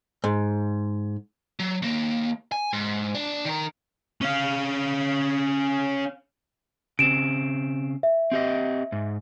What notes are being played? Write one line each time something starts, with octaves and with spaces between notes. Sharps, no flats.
G#2
F#3
D#2 A#3
G#5
G#2
D4
D#3 A#4
C#4 F5
C#3 C4 D7 E7
E5
C4 G4 D#5
G#2